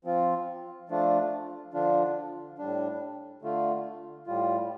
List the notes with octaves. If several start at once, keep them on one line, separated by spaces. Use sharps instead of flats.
F3 C4 F4
F3 A3 D4 F4
D3 F3 D4 F4
A2 G3 D4
D3 A3 F4
A2 G3 F4